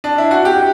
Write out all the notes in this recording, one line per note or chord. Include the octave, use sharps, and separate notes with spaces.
D4
E4
F#4
G4